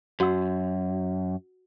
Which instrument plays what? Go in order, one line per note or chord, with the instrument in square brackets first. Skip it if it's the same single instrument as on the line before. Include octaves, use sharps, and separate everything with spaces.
[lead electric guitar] F#2 [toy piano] F#4 F#5 E6